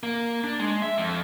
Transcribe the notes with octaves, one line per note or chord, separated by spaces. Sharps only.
A#3
D4
G#3
E5
F2